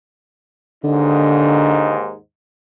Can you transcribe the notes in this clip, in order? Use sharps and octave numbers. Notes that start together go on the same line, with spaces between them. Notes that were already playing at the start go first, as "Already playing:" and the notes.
D#2 G#2 D3 D#4